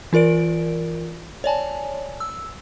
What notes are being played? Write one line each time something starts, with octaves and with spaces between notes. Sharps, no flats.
E3 F4 A#4 D5 D7
C#5 D5 G#5 A5
E6